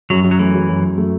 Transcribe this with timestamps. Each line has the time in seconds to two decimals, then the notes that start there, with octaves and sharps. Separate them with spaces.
0.10 F#2 F#3
0.24 F#2
0.31 F#3
0.39 E3 A3
0.54 F#3
0.69 F#2
0.84 F#2
0.98 A3